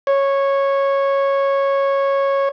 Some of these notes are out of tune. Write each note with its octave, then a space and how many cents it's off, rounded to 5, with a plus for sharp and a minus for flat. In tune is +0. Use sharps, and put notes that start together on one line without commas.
C#5 -10